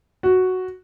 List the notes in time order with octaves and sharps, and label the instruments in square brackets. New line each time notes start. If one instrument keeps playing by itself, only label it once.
[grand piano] F#4